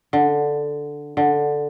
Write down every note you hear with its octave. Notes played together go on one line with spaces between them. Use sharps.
D3
D3